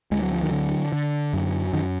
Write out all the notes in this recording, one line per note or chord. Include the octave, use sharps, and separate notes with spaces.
D2 G#3
F#3
F3
D#3 F#3
D3
D3
F#2
F#2 D#3